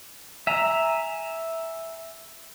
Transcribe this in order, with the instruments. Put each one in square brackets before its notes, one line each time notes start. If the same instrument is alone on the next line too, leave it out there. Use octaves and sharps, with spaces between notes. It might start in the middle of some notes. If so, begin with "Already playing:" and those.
[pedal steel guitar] E5 G#5 A#5